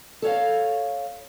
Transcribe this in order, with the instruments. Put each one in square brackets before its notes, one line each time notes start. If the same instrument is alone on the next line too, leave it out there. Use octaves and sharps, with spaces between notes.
[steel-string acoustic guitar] A4 C#5 F5